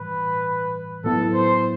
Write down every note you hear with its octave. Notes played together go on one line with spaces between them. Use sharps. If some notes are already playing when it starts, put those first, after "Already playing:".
Already playing: A2 E3 G3 B4
A2 F#3 B3 E4 A4
C5